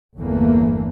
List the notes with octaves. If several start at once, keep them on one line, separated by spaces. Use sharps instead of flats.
G1 E2 E3 A3 A#3